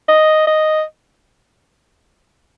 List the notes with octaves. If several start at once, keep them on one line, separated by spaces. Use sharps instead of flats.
D#5
D#5